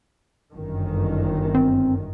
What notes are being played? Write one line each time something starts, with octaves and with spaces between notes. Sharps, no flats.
G1 F#2 D#3
C4